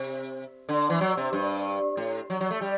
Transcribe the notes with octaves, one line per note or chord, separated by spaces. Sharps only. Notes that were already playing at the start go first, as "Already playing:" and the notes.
Already playing: C3
D3
E3
F#3
C3
G2
A2
F#3
F#3
A3
G3